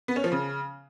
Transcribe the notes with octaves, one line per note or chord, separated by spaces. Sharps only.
B3
C#4
F3
C#3